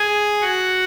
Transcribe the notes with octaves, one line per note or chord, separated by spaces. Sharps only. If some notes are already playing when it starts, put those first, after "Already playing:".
Already playing: G#4 G#5
F#4 F#5